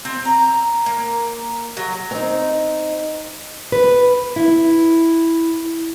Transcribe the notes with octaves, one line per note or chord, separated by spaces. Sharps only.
C4
A#5
A#3
F#3
C4 D#4
B4
E4